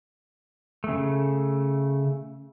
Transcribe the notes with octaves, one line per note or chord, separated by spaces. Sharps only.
C#3 A3